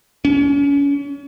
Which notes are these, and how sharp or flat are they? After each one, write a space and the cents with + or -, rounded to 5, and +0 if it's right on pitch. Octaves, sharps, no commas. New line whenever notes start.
C#4 +35